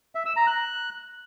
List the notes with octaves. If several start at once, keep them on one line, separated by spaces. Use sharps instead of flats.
E5
E6
A#5
F#6